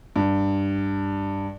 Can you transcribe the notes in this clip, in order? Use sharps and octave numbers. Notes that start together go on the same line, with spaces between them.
G2